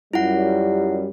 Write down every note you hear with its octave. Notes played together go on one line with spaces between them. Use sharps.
F#2 G3 E4 F4 F#5